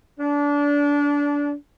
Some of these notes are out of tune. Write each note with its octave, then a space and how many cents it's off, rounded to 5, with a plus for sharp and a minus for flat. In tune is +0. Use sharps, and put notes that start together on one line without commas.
D4 -25